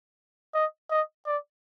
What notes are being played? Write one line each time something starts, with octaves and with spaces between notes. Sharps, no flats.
D#5
D#5
D5